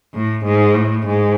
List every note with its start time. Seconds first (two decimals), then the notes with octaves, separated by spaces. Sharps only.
0.14 A2
0.45 G#2
0.74 A2
1.06 G#2